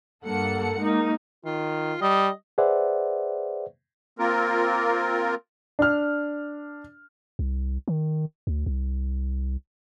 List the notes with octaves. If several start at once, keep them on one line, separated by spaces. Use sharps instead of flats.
G2 A#3 A4 F#5 C#7
G#3 A#3 D#4
D#3 F4
G3 D#5
G#4 B4 C5 D5 E5 F#5
A#3 C4 F4 A#4
D4 F6
C2
D#3
D2
C2